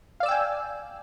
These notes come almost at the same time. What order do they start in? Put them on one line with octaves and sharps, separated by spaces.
F5 D5 E6 G5 G#5